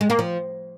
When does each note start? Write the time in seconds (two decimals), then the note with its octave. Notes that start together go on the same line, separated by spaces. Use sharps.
0.01 G#3
0.10 A#3
0.19 F3